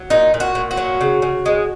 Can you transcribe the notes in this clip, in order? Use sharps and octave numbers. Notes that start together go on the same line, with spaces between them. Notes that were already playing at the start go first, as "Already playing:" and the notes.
Already playing: F#3
A#2 D#4
A#2
F#4
A#2
F#4
F#3
C#3
C#3
G#3